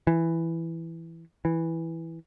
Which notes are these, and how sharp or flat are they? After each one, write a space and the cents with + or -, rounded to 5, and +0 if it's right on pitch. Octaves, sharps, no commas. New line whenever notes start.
E3 +5
E3 -5